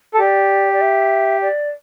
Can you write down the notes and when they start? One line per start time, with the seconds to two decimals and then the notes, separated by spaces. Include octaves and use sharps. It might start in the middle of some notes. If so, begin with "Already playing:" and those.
0.14 A4
0.19 G4 D5
0.73 D5
0.81 E5
1.41 D5